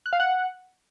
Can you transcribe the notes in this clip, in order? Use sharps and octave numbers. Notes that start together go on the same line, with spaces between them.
F#6
F5
F#5